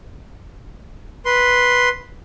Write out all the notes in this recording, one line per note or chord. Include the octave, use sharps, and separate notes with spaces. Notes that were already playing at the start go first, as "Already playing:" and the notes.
B4 C6